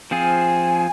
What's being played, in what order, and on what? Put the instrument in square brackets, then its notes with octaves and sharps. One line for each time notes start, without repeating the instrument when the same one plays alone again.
[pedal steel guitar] F3 C4 F4 G#4 [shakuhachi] G#5